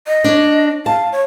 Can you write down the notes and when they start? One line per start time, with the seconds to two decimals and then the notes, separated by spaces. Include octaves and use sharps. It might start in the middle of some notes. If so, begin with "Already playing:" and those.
0.07 D#5
0.24 D4 C#5
0.86 F5 A5
1.12 C#5